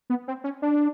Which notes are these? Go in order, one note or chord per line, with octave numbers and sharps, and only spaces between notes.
B3
C4
C#4
D4